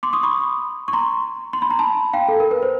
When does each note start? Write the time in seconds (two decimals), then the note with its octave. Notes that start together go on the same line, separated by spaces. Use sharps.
0.03 C6 D6
0.13 C#6 D#6
0.23 B5 C#6
0.88 C#6
0.93 A#5 C6
1.53 C6
1.62 B5
1.71 A#5
1.79 A5 B5
2.13 F5 G5
2.28 A4
2.40 A#4
2.51 B4
2.62 C5